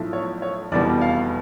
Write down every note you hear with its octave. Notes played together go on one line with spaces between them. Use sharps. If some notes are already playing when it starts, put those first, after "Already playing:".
Already playing: B1 A2 F3 A3
C#5
C#5
F1 E2 B2 G3 B3 D5
F5